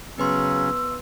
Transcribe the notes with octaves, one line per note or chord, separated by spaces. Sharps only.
C#3 F#3 B3 C#4 B4 C6 E6